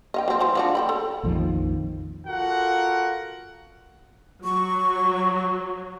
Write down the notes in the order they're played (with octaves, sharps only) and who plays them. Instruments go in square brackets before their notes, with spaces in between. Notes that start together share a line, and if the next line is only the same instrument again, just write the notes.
[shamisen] D#5 F5 G5
F#3 C4
E3 F#4 C5
F3 D4 F#4
A4 G5 B5
A4 B5
[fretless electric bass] A#1 F2 D#3 F3
[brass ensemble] F4 F#4 A4 A#4 F#5
[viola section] F#3 [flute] C#6